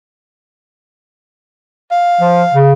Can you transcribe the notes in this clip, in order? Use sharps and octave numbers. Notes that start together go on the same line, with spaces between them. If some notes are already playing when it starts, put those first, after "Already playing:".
F5
F3
C#3